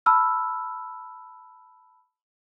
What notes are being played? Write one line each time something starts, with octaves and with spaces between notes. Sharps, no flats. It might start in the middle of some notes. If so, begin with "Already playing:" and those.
A5 B5 E6 F6